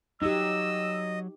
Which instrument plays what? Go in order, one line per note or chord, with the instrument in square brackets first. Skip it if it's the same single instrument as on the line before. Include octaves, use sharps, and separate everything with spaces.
[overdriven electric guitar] F#3 [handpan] D#4 G4 [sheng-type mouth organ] D#5 [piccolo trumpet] E6